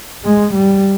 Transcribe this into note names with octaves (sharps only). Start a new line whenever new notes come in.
G#3
G3